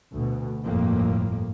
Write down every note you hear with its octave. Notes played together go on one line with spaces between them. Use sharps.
D2 B2
G1 F2 A2 A#3